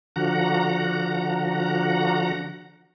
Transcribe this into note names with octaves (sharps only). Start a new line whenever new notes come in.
D3 F3 F#4 F#5 A#5